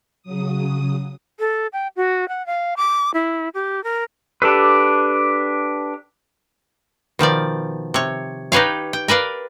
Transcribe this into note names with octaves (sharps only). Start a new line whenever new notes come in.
C#3 F#3 D#6
A4
G5
F#4
F#5
F5
D6
E4
G4
A#4
D4 G4 A4 B4
B2 D#3 F3 D5
C3 C#5
D#4 G4 B4 C#5 F5
G5
A#4 B4 D5 F5